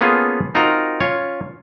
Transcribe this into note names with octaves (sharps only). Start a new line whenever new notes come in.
A#3 B3 C#4 F4 G#4 A4
C4 D#4 F4 F#4 A#4 A#5
C#4 F4 C#5